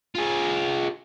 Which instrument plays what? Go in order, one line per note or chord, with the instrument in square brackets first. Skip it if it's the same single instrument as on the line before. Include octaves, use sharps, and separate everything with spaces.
[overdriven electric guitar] F4 G#4